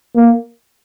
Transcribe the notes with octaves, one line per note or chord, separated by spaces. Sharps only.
A#3